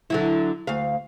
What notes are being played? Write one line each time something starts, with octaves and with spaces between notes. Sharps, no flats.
D3 F#3 E4
D2 F5